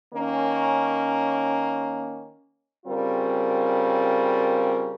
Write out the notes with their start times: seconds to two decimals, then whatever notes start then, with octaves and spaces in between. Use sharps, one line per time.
0.14 D#3 A#3 C#4
2.86 C#3 G3 C4 F4 A#4